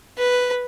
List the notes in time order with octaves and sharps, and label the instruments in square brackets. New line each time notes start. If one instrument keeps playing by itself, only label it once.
[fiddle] B4